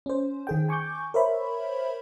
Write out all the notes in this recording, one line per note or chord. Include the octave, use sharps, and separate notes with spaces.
C#4 C5
D#3 G#4 G5
G#5 C#6 D6 G6
A#4 C5 C#5 E5 B5